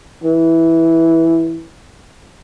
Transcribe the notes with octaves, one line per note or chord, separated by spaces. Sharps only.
E3